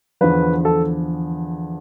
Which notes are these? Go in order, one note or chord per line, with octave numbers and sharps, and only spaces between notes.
E2 D3 F3 B4
A4